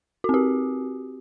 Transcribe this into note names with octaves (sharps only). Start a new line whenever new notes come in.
C4 F#4 G4